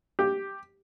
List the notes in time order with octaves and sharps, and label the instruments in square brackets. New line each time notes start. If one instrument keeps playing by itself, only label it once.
[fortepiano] G4